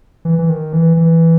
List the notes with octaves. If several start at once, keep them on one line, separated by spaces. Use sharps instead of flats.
E3
E3
D#3
E3
E3